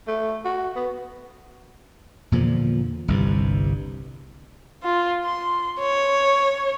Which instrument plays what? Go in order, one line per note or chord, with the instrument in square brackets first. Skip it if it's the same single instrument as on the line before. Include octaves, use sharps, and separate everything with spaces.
[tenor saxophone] A3
F#4
B3
[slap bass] E2 A#2 D3 F3
G1 C2 G2
[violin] F4
C6
C#5